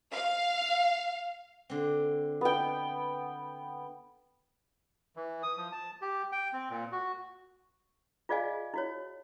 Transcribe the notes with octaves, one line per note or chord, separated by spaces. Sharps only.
F5
D3 C4
B3 G5
E3
D#6
F3
A5
G4
G5
C4
A#2
F#4
F4 G#4 D5 D#5 F5 G#5
E4 F#4 C#5